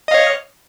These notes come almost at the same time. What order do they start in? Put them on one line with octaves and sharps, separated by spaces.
D#5 F5 C#5